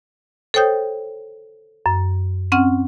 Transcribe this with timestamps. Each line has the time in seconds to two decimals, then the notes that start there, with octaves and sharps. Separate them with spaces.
0.54 A4 C5 C#5 G5 D#6 G6
1.86 F#2
2.52 C4 C#4 F#5 F6